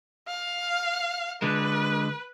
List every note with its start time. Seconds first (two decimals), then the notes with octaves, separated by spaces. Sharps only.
0.28 F5
1.42 D3 G#3 B4